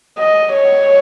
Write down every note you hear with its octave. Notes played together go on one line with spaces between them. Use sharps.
D#5
C#5